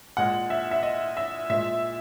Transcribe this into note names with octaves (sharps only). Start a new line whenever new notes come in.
A#2 G#3 F#5
E5
E5
D#5
E5
A#2 G#3 E5